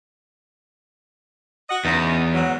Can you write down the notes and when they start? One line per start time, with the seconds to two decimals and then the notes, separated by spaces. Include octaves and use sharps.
1.69 F#4 D#5 F#5
1.85 E2 C#3 D#4
2.34 G#2 F#3